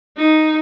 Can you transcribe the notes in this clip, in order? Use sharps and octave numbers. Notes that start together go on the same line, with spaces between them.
D#4